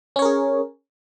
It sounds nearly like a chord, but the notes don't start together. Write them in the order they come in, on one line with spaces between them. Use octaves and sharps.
C#4 C#5 A#4 G#4